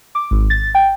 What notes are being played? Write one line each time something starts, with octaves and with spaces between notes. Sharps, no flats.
D6
G#1
A6
G5